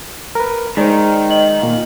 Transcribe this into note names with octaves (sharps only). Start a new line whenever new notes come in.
A#4 B4
D#3 G#3 D#4 C5 D5
D#5 F#7
A#2 F5